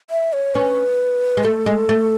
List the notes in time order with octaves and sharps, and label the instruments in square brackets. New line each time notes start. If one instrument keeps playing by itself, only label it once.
[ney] E5
C#5
[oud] C#4 [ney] B4
[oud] G#3
[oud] A3 [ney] A4
[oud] G#3
A3